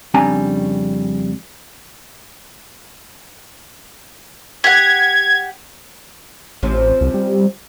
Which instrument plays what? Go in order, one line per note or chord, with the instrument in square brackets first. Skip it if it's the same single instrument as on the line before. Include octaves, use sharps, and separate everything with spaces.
[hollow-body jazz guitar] F2 C#3 G3 D4 G#5 A#5
[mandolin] G4 F#5 [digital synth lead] G#6
[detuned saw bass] A1 [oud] C3 F3 C#4
[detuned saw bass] C2
G3